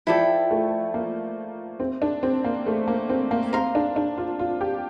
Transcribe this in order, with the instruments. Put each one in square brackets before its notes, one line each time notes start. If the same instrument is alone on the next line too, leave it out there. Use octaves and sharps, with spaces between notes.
[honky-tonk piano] F3 [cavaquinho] E4 A4 D5 G5
[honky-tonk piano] A3
A#3
C4
D4
C4
A#3
A3
A#3
C4
A#3
[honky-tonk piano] C4 [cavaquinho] A#4 F5 C6
[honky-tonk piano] D4
D4
F4
F4
G4